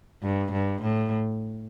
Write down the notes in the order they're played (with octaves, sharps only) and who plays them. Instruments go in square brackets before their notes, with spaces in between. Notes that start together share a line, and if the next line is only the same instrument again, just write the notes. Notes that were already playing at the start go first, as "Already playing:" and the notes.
[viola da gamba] G2
G2
A2